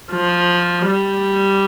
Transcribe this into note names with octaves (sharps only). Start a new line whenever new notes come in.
F3
G3